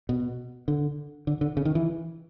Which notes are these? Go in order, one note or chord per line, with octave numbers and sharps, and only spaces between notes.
B2
D3
D3
D3
C#3
D#3
E3